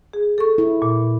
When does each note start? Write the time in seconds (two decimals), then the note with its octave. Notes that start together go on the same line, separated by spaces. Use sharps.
0.13 G#4
0.38 A4 C#6
0.58 E4
0.82 A#2